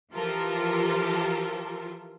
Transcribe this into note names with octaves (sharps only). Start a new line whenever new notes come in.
E3 F3 F4 G4 A4 A#4